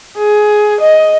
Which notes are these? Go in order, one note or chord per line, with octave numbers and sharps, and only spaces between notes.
G#4
D#5